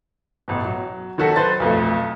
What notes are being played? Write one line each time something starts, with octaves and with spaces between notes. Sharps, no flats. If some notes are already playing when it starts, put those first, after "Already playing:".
A1 B2
F#3
D#3 F#3 F#4 A4 B6
B4 C5 A6
B1 F2 A3